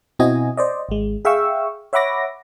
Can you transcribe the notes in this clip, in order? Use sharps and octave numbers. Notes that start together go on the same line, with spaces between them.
B2 C4 E4 F#4 D#5 G#5
C5 D5 D#5
G#1 G#3
G#4 E5 F5 G5 C#6 E6
C#5 E5 F#5 B5 D6 A#6